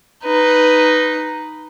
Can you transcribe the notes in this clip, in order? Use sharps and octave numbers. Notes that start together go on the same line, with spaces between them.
D#4 B4